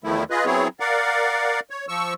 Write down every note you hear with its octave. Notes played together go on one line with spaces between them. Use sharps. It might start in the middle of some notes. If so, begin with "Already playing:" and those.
E2 D#3 F3 A3 E4
F4 G#4 B4 D#5
F#3 B3 C4 E4 G#4 C#5
A#4 D5 F5 F#5
C#5
F3 C#6 E6